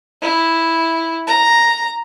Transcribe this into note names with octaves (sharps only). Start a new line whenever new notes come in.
E4
A#5